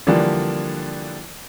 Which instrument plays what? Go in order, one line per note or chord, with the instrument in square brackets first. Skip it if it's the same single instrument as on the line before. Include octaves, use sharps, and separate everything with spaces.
[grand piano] D3 E3 F3 G3 A#3 D4